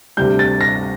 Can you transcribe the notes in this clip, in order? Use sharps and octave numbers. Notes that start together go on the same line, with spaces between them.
D2 C3 G3 G6
A6
A#6